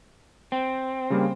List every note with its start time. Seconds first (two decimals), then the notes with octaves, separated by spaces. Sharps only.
0.52 C4
1.10 C#3 G3 A#3